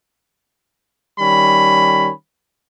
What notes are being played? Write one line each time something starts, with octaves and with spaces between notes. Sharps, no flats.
D#3 G3 C#4 B5